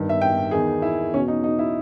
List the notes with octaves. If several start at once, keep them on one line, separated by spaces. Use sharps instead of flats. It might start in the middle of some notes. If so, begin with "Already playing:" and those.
Already playing: G2 D#3
E5
G5
E2 D#3 G#4
E4
E2 B2 C#4
D#4
D#4
E4